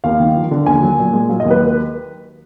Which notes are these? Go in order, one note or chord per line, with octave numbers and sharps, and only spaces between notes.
D#2 F5
D#3
F3
D3
D#2 G#5
F#3
A#2
G#3
F#3 F5
D#5
D#2
B4